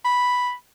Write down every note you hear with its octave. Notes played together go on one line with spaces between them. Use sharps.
B5